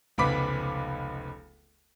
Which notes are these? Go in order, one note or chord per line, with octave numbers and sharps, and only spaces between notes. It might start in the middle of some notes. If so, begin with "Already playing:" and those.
F1 C#2 B3 B5 D6 B6